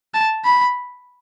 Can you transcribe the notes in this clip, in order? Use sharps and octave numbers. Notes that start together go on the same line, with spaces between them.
A5
B5